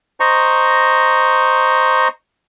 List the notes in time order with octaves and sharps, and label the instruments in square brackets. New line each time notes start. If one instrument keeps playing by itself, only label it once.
[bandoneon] C5 D#5 A#5 C#6